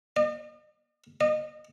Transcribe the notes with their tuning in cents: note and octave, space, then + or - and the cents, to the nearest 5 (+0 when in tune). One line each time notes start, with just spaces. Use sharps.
D#5 -40
D#5 -25